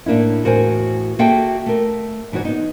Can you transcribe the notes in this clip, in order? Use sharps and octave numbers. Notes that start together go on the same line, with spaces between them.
A2 A3 A#3 D4 E4
E2 A2 F#4 A#4 C5 G#5
A#3 F#4 G#4 A4 E5 G5
A3 A#4
G#2 E3 D#4 F#4 C#5
B3 D#4